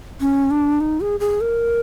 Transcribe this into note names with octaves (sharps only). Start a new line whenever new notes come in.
C#4
D4
D#4
G#4
G#4
A#4